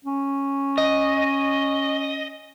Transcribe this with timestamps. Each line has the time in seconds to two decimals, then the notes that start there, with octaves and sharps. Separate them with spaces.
0.05 C#4
0.78 D#5